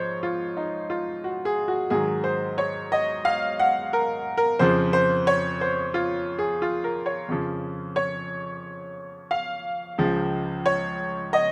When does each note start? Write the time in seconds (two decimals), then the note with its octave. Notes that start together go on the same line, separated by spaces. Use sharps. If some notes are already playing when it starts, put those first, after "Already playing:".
Already playing: G#2 F3 C5 C#5
0.23 F4
0.57 D#4
0.90 F4
1.24 F#4
1.45 G#4
1.68 F#4
1.90 G#2 D#3 F#3 G#4
2.24 C5
2.58 C#5
2.92 D#5
3.25 F5
3.59 F#5
3.93 A#4
4.37 A#4
4.59 F2 C#3 F3 C5
4.93 C5
5.27 C#5
5.61 C5
5.94 F4
6.39 G#4
6.62 F4
6.84 A#4
7.06 C#5
7.29 F2 C#3 F3
7.96 C#5
9.31 F5
9.98 C#2 C#3 F3
10.66 C#5
11.33 D#5